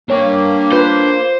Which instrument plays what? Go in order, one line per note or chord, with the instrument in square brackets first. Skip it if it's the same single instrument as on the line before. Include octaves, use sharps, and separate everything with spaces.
[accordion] A#3 [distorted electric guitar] D4 G5 [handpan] C#5
[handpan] F4 B4 [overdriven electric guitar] C5